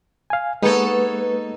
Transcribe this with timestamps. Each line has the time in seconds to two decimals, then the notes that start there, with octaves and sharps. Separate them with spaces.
0.30 F5 G#5
0.62 G#3 A#3 B3 D#4 A4 B4 C#5